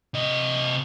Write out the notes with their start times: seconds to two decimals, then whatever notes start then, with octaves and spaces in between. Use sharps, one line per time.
0.14 C3 D#5